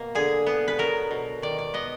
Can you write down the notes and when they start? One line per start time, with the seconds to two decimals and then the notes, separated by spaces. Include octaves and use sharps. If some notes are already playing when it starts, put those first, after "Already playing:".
Already playing: B2 A#3
0.15 D3 G#4
0.46 B3
0.68 B4
0.78 F#3 A#4
1.11 B2
1.42 D#3 D5
1.58 D5
1.74 B3 D#5